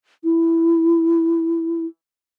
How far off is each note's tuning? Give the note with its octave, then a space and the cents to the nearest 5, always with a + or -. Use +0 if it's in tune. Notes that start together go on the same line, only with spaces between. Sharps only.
E4 +10